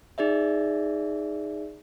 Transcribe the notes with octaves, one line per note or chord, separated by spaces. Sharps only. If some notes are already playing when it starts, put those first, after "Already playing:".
D#4 G#4 D5 E5